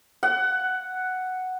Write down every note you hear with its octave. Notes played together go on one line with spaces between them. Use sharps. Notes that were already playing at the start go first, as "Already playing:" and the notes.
F#5